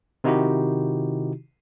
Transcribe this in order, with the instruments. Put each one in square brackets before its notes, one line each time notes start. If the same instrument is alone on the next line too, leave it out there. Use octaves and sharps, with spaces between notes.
[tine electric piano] C3 D#3 D#4 E4 F#4 G4